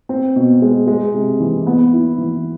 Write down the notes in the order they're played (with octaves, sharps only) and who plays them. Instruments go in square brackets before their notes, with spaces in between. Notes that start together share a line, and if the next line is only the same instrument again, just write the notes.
[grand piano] C4
B2
G#3
G#3
C3
E3
B3
E4
E3